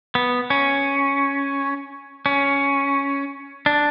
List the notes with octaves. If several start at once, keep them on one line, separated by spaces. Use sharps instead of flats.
B3
C#4
C#4
D4